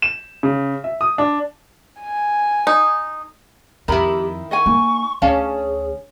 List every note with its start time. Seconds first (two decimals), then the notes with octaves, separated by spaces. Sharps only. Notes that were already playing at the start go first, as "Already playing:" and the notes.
0.02 E7
0.43 C#3
0.84 E5
1.01 D#6
1.18 D4
2.01 G#5
2.67 D#4
3.88 F2 D#3 E4 G4 A#4 A#5 B5
4.51 D#5 F#5 G#5 C#6
4.66 A#3 D#4
5.22 D2 C#4 G#4 D5 F5 A5